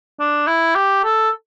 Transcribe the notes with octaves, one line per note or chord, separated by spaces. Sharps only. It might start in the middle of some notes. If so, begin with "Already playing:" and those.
D4
E4
G4
A4